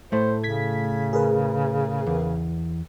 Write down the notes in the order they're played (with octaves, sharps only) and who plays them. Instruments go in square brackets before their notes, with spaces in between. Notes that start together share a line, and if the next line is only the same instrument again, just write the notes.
[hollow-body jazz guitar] A2 A3 [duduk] C5
[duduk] C#3 [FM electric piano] G#6 B6
[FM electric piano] G#4 A#4 B4
[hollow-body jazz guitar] E2